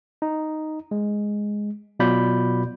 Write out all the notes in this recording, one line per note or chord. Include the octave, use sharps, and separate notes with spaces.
D#4
G#3
B2 F#3 F4 D5 B5 G6